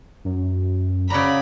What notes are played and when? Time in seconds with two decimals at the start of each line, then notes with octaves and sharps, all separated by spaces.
0.24 F#2
1.10 C#3 F#4 D5 A#5 B5